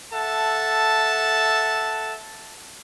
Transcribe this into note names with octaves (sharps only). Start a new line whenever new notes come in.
A4 E5 F#5 A5